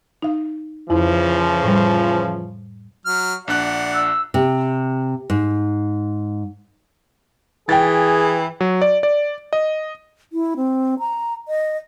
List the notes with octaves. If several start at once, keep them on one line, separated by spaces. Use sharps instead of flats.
D#4 F5
F2 C#3 E3 F3 E4
A2 G3
F#3 F6
A#1 D4 D5 F#5 F#6
E6
C3
G#2
E3 G#4 G5 A6
F#3
D5
D5
D#5
E4
C4
A#5
D#5